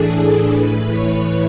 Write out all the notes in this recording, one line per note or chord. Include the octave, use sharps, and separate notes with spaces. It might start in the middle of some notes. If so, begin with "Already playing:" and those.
Already playing: A2 E3 D4 G#4 A4
A4
A2 E3 B4
C#5